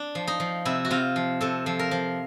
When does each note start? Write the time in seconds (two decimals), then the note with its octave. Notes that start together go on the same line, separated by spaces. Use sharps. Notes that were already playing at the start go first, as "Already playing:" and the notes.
Already playing: D4
0.15 F3
0.27 D#4
0.40 F3
0.65 C3 E4
0.85 F#4
0.90 C3 F4
1.16 F3
1.41 C3 A4
1.66 F3
1.79 A#4
1.91 F3